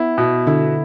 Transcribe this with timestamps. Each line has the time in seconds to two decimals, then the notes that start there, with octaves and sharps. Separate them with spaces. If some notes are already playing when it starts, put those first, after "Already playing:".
Already playing: B3 E4
0.18 B2
0.47 D3 E4